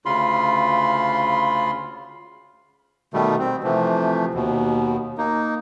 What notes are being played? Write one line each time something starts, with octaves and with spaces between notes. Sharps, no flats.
D2 C#3 F4 B5 C6
B2 D#3 G3 A3
C4
C3 E3 F3 A3
D#2 B2
A#3 D#4